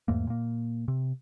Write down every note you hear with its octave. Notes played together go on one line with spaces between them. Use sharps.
E2 G#2 A3 A#3
A#2 A#3
C3